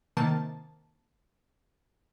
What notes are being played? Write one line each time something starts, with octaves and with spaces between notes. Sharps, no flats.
C3 D#3 A#3 A5